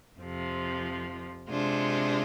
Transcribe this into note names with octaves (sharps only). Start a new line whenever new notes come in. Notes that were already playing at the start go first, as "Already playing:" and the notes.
F2 C3 F3
C3 G#3 D4 F4